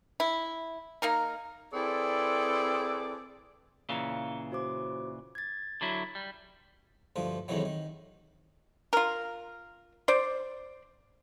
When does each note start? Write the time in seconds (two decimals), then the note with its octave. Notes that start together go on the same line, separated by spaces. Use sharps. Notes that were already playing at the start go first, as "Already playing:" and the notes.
0.20 E4
1.02 A#3 D#4 A#4
1.73 C4 E4 G#4 A4 B4 D5
3.89 A#2 C#3 E3 F5 A#5 C#7
4.52 F#4 C5 D6
5.35 G#6 A6
5.81 D3 F#3 E4
6.15 G3
7.16 D2 G2 F3
7.48 E2 A2 C3 D#3 E3 F#3
7.65 D#3
8.93 F4 A#4
10.08 C5 D5